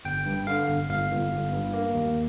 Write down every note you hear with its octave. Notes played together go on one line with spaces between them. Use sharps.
G1 G5
G2
D3 F5
G1
G1 F5
G1
G1
G2
A#3
D#2